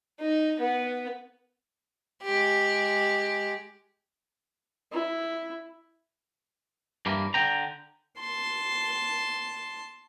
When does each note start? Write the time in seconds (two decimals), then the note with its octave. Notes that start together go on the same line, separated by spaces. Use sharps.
0.19 D#4
0.59 B3
2.22 G#3 G4
4.92 E4
7.06 G2 E3 A#3
7.34 D3 G5 A#5
8.19 A5 C6